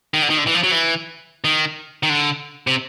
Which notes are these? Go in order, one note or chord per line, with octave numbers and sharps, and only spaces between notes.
D#3
D3
D#3
D3
E3
F3
F#3
E3
D#3
D#3
D3
C3